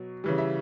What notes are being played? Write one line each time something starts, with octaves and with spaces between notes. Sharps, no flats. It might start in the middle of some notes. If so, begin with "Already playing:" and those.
Already playing: B2 F#3
C#3 E3 G3
E5